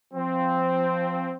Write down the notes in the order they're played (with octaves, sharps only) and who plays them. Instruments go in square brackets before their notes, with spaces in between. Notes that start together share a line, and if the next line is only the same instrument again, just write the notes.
[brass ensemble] F3 C4